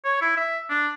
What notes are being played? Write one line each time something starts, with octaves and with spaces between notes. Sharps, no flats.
C#5
E4
E5
D4